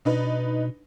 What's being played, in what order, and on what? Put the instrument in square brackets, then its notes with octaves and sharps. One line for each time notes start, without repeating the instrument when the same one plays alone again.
[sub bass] B2 [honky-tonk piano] D4 D#4 B4